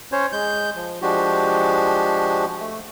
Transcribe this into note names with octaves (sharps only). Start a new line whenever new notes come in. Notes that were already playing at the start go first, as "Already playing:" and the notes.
C#4 C5 C#5
G#3 G6
F3
F3 G#3 D4 F#4 G4
A3